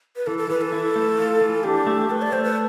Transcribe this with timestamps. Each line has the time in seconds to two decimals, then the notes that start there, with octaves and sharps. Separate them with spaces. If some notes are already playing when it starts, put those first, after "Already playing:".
0.16 B4
0.27 E3 A4
0.38 A4
0.50 E3 B4
0.61 A4
0.72 E4
0.96 A3
1.18 F4
1.41 E3
1.64 D4 G4
1.87 A3
2.09 A3 B4
2.22 D5
2.32 A3 C5
2.44 B4